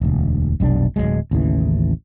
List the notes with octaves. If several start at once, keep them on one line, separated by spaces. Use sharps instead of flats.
E1 D2
F1 B1 G3 D4
D1 F2 F#3 G#3
A1 D#2 C#3 E3